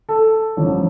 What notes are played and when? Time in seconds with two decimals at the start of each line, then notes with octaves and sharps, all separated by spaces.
0.09 A4
0.57 A1 G2 F3